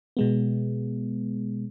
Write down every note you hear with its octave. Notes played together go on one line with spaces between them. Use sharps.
B2 G#3 B3